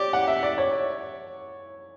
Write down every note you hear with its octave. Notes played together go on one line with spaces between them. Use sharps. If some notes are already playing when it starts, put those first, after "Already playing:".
Already playing: G4 C#5 D5
F#5
E5
D5
C#5